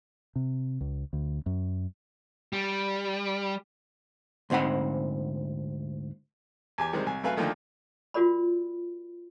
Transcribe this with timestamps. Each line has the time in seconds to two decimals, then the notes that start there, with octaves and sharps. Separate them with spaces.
0.36 C3
0.81 C#2
1.13 D2
1.46 F#2
2.53 G3
4.50 D2 G#2 C4 F#5 B5
6.78 E2 G4 G#5
6.93 C3 D#3 G3 G#3 C5
7.06 C2 G#5
7.23 F#2 A3 B4 E5 F5 G#5
7.37 D2 D3 D#3 F3 A3 A#3
8.14 F4 F#4 A#4 D5 B5